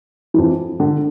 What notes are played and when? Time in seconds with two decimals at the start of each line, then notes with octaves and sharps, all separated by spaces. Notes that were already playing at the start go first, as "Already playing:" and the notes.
0.34 F2 E3
0.80 D3